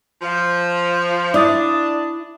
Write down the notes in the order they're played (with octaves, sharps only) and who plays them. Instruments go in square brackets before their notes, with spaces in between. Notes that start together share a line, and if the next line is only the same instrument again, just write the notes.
[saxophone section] F3
[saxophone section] D4 [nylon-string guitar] E4 [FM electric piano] D5 D#6 A6